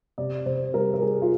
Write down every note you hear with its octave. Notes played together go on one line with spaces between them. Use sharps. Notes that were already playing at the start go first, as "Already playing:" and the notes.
C3 D5
C3 C5
G3 A#4
A#4
G3 G#4
F4